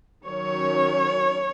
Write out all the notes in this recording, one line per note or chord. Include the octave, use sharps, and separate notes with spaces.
D#3 F#3 C#4 C#5